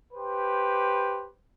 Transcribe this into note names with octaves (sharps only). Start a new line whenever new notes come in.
G4 B4 C5